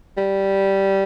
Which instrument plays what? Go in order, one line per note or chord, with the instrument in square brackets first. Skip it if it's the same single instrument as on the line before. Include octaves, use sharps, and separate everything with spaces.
[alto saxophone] G3